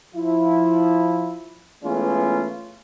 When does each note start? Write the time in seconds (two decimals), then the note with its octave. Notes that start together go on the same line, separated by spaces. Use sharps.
0.15 F3 E4
1.84 E3 G#3 A3 B3 C#4 F4